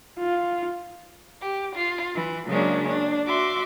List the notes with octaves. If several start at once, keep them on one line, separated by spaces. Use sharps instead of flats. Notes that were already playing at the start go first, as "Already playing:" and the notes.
F4
G4
F4
E3
C#3 F#3 G#3 A#3 C#4 D4
D4
F#4 E5 C6 D6